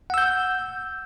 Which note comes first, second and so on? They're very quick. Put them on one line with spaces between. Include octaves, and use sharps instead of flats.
F#5 E6 G6